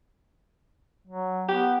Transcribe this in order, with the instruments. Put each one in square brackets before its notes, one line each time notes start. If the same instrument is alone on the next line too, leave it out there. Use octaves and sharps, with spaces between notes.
[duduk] F#3
[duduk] B3 [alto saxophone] G4